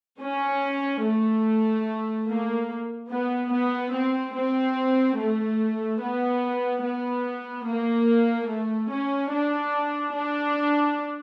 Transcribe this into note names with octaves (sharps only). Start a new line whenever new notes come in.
C#4
A3
A#3
B3
B3
C4
C4
A3
B3
B3
A#3
A3
C#4
D4
D4